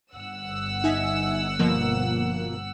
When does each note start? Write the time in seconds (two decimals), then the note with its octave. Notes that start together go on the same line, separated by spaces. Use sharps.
0.15 G1 F#5 E6
0.84 D#4 E5 G#5
1.59 B2 F3 A#3